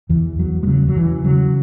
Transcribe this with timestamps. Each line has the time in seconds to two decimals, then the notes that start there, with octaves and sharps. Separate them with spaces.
0.09 E2 E3
0.39 E2 F#3
0.63 G#3
0.67 C#3 F#3
0.88 F#3
0.96 E2 E3
1.24 C#3 F#3